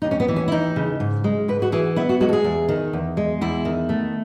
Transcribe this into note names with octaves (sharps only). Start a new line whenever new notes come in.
D#2 D#4
C#4
B3
E3
C#4
E4
D#2 D#4
C#3
G#2
G#3
G#2 B4
F#4
E3 G#4
B3 E4
F#4
G#3 F#4
A4
G#4
E2
D#3
E2
G#3
E2 E4
D#3
A3